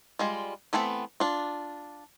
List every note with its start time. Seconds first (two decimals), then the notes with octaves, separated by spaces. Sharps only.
0.19 G3 G#3 F4
0.73 E3 A3 B3 C4 B4
1.20 D4 F4